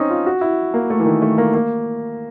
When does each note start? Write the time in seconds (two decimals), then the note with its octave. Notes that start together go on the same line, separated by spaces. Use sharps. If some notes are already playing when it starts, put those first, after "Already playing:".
Already playing: C4 C#4 D#4
0.10 F4
0.26 F#4
0.41 E4
0.74 A#3
0.90 A3
1.00 E3
1.05 D#3
1.22 A3
1.38 A#3
1.54 A#3